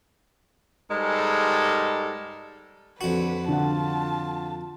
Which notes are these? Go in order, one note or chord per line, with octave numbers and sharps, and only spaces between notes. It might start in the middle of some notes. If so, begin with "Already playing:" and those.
G#2 G3 G#3 A4 A#4
F2 D3 F#4 B4
D3 F4 F#5 A5